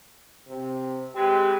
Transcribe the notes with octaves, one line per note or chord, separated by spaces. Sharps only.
C3
G#3 C4 G4 B4